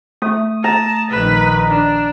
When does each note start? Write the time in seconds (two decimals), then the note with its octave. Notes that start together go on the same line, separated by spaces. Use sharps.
0.22 A3 D#6
0.64 A5 A#5
1.10 A#1 D#3 B4
1.69 D4